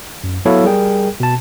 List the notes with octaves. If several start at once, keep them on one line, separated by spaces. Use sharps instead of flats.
F#2
F#3 B3 E4 A4 C#5 F5
G3 G#4 A#4 G5
B2 A5